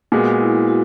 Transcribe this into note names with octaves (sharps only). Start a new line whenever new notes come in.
A#2 G#3 B3 F#4
E4
F#4